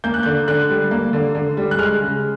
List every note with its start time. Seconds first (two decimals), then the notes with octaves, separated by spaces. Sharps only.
0.04 A#3 G6
0.14 F#6
0.23 D3 G6
0.48 D3 F#6
0.70 G3
0.91 A#3
1.13 D3
1.35 D3
1.57 G3
1.71 F#6
1.79 G#3 F6
2.01 C#3